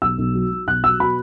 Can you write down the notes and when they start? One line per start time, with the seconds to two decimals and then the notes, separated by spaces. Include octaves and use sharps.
0.02 B1 E6
0.18 B1
0.34 F#3
0.51 F#3
0.67 B1 F#6
0.84 F#3 E6
1.00 B2 B5